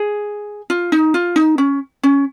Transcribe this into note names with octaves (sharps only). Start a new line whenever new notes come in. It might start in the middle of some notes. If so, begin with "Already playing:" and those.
Already playing: G#4
F4
D#4
F4
D#4
C#4
C#4